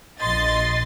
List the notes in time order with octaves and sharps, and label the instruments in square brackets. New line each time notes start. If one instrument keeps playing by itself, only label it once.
[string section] A#1 D#5 C6 A6